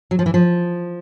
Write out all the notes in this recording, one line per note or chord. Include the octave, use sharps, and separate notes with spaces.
F#3
F3
E3
F3